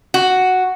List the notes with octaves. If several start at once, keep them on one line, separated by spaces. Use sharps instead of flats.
F#4